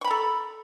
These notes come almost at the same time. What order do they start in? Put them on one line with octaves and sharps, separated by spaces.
C#6 B5 A#5 A4